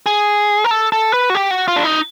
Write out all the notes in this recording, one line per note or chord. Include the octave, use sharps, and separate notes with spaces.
G#4
A#4
A4
A4
B4
F#4
G4
F#4
F4
D4
D#4